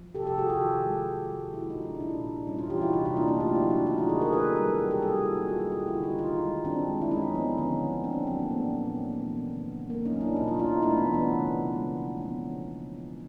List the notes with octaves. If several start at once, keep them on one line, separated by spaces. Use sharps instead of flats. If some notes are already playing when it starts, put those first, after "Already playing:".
Already playing: F3
C3 G4 A4
G4 A4
C3 F#4 G#4
F4 G4
D#3
G#3
D#3
G#3
A#3 E4 F#4
D#4 F4
F3
D4 E4
A#2 D4 E4
A#2
G3 C#4 D#4
D#4 F4
E3 F4 G4
E4 F#4
C3 D#4 F4
D#4 F4
A#3 D4 E4
D#4 F4
A3 F4 G4
E4 F#4
F#3
D4 E4
D#3 D#4 F4
E4 F#4
D#3 F#4 G#4
G#4 A#4
A#3 A4 B4
G3 G#4 A#4
B2 G4 A4
G4 A4
B2 G#4 A#4
G4 A4
A#3 E4 F#4
D#4 F4
G3 E4 F#4
F#4 G#4
D3 F4 G4
E4 F#4
D3
D#4 F4
D#3 D#4 F4
G#3
D#3 C4 D4
G#3
E4
G#3 C#4 D#4
F3 B3
D3 B3 C#4
D3
A#3 C4 D4
F#3 C4 D4
A#3 C4
A#2 B3
A#2
B3
G#3 A#3
B3
E3
B3
C#3
C#3
A#3
C#4 D#4
F#3
D4 E4
B2 D#4 F4
D#4 F4
B2 D#4 F4
A3 D4 E4
B3
E3
B3 C#4
C#3
C#3
G#3
F3
C#3 B3 C#4
C#3